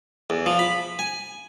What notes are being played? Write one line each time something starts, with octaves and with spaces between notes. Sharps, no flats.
E2
F3
B5
G#5